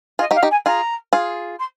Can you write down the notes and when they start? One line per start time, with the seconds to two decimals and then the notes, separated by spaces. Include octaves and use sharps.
0.19 F4 G#4 D#5
0.31 D#4 G4
0.35 F5
0.43 D#4 G4
0.50 G#5
0.66 F4 G#4 A#5
1.13 F4 G#4
1.59 C6